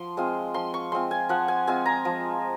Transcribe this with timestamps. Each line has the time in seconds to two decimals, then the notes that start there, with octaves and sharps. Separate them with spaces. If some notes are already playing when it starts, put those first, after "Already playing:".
Already playing: F3 C6
0.17 G#3 C4 F4
0.54 F3 C6
0.74 C#6
0.92 G#3 C4 F4 C6
1.11 G#5
1.29 F3 F#5
1.48 G#5
1.67 G#3 C4 F4 G#5
1.86 A#5
2.05 F3